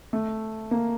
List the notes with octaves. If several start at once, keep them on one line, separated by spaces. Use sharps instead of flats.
A3
A#3